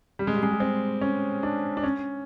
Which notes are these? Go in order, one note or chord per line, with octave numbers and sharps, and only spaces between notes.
G3
G#3
G3
G#3
G3
C4
C#4
D4
D4
C#4